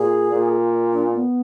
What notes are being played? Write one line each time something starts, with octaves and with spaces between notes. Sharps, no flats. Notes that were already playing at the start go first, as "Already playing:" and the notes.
Already playing: A#2 G#4
A#2
D4
B3